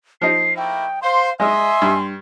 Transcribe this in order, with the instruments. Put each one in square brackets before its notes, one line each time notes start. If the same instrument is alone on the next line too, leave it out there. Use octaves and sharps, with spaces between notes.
[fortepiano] F3 D#4 [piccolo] C7
[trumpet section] A3 A#3 E4 [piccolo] G5
[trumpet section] C5 [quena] F5 [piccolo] C6
[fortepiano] G#3 [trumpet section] D#5 E5 [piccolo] G#5 [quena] C6
[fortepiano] G2